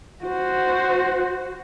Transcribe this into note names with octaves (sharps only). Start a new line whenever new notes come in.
F#4 C5